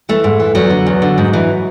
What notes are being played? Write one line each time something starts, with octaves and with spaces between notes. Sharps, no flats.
E3 A3
G#2
E3
E2 F#3
D3
E2
D3
G#2
E3